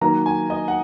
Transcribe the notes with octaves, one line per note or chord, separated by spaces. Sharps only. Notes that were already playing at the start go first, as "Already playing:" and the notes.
D#3 F#3 A#3 A#5
G#5
D#5
F#5